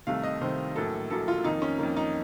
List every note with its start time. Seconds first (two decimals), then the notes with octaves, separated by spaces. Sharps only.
0.07 C2 C3 D#3 A3 F5
0.23 D#5
0.41 C2 C3 D#3 A3 C5
0.76 A#1 A2 F#3 A#3 A4
1.10 A#1 A2 F#3 A#3 A4
1.28 F4
1.44 F2 D#3 A#3 D#4
1.62 C#4
1.78 F2 D#3 A#3
1.97 D#4